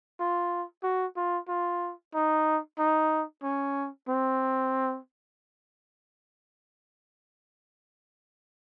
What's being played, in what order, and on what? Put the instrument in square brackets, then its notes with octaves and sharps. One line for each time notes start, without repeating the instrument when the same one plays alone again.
[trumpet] F4
F#4
F4
F4
D#4
D#4
C#4
C4